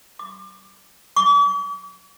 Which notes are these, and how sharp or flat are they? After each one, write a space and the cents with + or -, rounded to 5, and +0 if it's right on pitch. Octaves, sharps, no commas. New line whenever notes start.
D6 +30
D6 -45